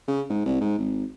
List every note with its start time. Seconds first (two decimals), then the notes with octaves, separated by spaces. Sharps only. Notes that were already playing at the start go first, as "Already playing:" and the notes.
0.08 C#3
0.30 G#2
0.46 C2
0.61 G#2
0.78 G#1